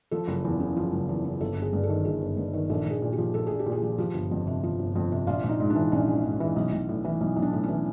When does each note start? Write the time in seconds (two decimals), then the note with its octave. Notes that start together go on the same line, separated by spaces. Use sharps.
0.11 F3 A4
0.28 F#1
0.45 E2
0.60 C#3
0.77 F3
0.93 F#1
1.09 E2
1.24 C#3
1.40 G1 A4
1.57 G1
1.62 G#4
1.73 G2
1.83 A4
1.89 D#3
2.05 G1 G#4
2.22 G1
2.37 G2
2.54 D#3
2.70 A#1 A4
2.86 A#1 G#4
3.02 A#2
3.13 G4
3.18 F3
3.34 A#1 A4
3.47 A#1 G#4
3.59 G4
3.66 A#2
3.72 G#4
3.82 F3
3.98 F3 G4
4.14 G1
4.31 F2
4.47 C3
4.63 F3
4.79 G1
4.95 F2
5.11 C3
5.27 A#1 F4
5.44 A#1
5.49 D#4
5.60 G#2
5.70 D4
5.76 E3
5.92 A#1 C#4
6.08 A#1
6.24 G#2
6.40 E3
6.56 B1
6.72 B1
6.89 A2
7.05 E3
7.21 B1
7.36 B1
7.42 D4
7.53 A2
7.63 C#4
7.69 E3